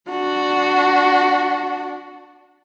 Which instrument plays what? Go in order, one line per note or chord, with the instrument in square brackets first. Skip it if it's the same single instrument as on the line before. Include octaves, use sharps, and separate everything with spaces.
[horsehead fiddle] D4 F#4